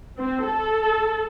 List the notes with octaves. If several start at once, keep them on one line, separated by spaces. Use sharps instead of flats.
C4
A4